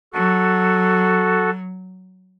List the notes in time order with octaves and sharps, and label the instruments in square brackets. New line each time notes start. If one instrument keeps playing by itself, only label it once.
[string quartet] F#3 [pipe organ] F#4 A4